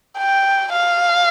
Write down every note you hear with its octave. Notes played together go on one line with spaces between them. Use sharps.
G5
F5